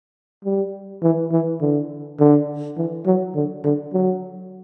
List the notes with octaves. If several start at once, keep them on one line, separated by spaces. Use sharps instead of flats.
G3
E3
E3
D3
D3
E3
F#3
D3
D3
F#3